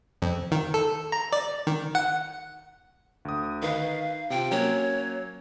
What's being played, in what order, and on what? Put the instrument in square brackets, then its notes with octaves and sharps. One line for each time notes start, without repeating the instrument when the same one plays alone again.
[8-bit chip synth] F2
D#3
A4
A#5
D5
D#3
F#5
[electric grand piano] D2 D#6
[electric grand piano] D#3 B4 [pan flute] F5
[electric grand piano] C3 F4 [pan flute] G5
[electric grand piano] F#3 A#3 C#4 [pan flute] C#5